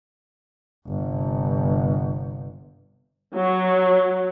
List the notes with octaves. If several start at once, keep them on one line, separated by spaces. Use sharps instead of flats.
G1 C3
F#3